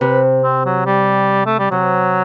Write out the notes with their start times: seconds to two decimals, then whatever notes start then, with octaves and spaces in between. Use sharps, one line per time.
0.01 C3 B4
0.43 C4
0.65 F#3
0.86 G3
1.46 A3
1.59 G3
1.71 C3 F#3